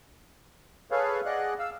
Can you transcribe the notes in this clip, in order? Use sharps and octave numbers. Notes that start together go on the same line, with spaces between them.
G#4 A4 B4 C#5 F5
G#4 D5 D#5 F#5 F#6
F5 E6